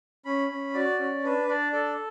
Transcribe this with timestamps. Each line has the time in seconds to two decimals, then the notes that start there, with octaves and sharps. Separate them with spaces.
0.25 C#4 B5
0.50 C#4
0.74 F#4 D5
0.99 C#4
1.23 D4 B4
1.48 D4 D5
1.73 A4 D5